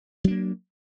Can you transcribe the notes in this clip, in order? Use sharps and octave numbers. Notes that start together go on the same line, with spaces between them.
F#3 A#3 D4